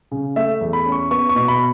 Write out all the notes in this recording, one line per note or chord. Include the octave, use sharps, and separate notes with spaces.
C#3
A3 E5
E2
B5
C#4
C#6
B3 C#6
C#6
B2
B5